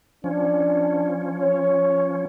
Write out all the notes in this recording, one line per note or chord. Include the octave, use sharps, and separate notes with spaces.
F3 C#4 D4
C#5